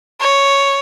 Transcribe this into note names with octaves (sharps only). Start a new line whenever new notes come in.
C#5